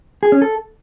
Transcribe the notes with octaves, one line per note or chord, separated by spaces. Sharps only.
G#4
C#4
A4